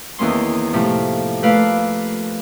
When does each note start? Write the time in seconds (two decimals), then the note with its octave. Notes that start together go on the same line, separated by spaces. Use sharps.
0.19 E2 D#3 A#3 C#4 C6
0.73 A2 C3 F3 A#3
1.42 A3 A#3 F4 B4 D5 F5